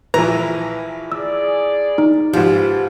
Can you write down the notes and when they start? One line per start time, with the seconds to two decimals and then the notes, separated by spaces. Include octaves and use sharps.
0.14 A#1 E3 E4 B4 A#5
1.12 G#4 D5 E6
1.98 D#4
2.33 G#2 F3 G4 B4 C5